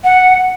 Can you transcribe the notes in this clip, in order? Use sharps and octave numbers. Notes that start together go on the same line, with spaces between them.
F#5